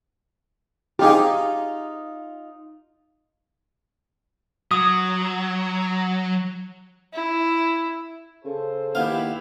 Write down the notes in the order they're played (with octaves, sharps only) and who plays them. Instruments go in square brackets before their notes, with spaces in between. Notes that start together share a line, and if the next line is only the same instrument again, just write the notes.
[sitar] D#4 F4 [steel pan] G4 G#4
[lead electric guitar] F#3 [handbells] D#6
[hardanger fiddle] E4
[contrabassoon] C#3 [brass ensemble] A4 C5
[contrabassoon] D#2 [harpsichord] B3 F5 [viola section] E4 G4